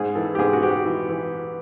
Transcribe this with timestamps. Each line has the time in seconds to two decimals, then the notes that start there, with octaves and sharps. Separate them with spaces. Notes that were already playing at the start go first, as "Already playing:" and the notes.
Already playing: G#2 G#4
0.15 E3 A4
0.35 G4
0.38 G#2 G#4
0.53 F#4
0.63 G#2 G4
0.86 E3
1.09 E3